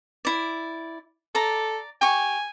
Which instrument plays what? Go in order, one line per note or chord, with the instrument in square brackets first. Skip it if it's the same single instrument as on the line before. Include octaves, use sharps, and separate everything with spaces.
[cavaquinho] E4 D5
[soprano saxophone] A4 [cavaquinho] D5 A#5
[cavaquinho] G4 C#6 [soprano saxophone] G#5